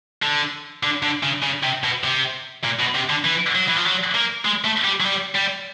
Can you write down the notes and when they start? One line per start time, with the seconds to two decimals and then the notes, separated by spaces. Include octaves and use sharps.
0.23 D3
0.83 D3
1.03 D3
1.23 C#3
1.43 C#3
1.64 C3
1.84 B2
2.04 C3
2.64 A#2
2.79 B2
2.95 C3
3.10 D3
3.25 E3
3.55 F#3
3.68 E3
3.76 F3
3.85 F#3
4.15 A#3
4.45 G#3
4.65 A3
4.85 G3
5.00 F#3
5.05 G3
5.35 G3